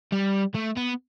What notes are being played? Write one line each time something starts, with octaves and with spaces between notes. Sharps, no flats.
G3
A3
B3